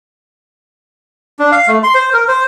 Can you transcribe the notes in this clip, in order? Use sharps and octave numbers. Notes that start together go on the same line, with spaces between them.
D4
F5
A3
C6
C5
A#4
C5